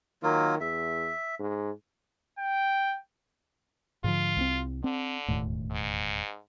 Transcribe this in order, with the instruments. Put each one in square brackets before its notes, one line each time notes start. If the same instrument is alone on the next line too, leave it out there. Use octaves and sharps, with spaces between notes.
[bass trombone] D#3 [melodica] F#3 A#3 F4
[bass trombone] E2 [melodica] E5
[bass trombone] G#2
[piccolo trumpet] G5
[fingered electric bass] G#2 D3 F3 [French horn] F4
[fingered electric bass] C2 G#3 C4
[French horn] D3 [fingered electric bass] C4
[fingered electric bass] E1 D#2 A2
[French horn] G#2